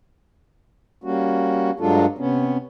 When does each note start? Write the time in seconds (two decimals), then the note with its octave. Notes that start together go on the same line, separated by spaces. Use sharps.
1.04 G3 A#3 C#4 F#4
1.80 G2 F#3 G#3 D4 F4 A4
2.18 C3 B3 C#4